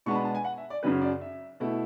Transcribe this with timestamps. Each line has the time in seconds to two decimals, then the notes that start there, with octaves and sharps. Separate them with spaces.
0.06 B2 G#3 B3 D4 A5 C#6
0.15 B5
0.25 A5
0.35 G#5
0.44 F#5
0.58 E5
0.70 D5
0.83 F#2 C#3 F#3 C#4 B4
1.01 D5
1.21 E5
1.60 B2 A3 E4